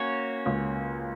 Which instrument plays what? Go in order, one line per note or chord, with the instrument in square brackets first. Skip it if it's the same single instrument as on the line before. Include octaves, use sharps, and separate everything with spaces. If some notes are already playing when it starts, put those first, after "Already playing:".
Already playing: [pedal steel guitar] A#3 C#4 F#4 C#5
[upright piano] C#2 C#3